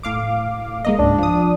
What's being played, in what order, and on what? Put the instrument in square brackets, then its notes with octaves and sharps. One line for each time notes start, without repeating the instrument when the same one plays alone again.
[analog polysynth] A2 F5 D6
G#3 A#3 D#5
[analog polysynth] C#2 G#2 [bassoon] D4
[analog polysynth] F3 D#6